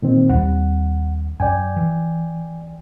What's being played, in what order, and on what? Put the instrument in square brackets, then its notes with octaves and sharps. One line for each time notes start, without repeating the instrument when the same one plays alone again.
[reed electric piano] A#2 D#3 C4
[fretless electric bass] D#2 G3 C4 [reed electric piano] F#5
[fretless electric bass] F#2 [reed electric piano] D5 G5 G#5
[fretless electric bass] E3